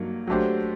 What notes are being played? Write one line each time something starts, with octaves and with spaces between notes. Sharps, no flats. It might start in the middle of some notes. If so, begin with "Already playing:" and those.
Already playing: G2 F#3 A#3 D#4
F#3 A3 D4 G4 C5